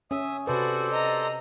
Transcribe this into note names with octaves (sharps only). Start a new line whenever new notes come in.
C#4 E5 D#6
C3 F#4 A4 B4 C5 D5
D#5 A#5